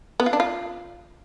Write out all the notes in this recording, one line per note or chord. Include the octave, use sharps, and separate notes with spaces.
B3
F4
D4
F4